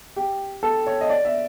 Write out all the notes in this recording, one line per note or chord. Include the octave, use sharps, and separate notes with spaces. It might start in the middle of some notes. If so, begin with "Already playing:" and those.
G4
A4
C#5
D#5
D5
E5